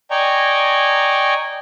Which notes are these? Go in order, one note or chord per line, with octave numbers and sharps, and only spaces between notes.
D5 D#5 G5 G#5 A#5 C#6